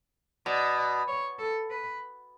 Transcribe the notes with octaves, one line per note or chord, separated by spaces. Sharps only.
B2 D5
D5
C#5
A4
B4